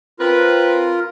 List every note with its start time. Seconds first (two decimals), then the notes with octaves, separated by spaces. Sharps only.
0.20 C4 F4 A#4 B4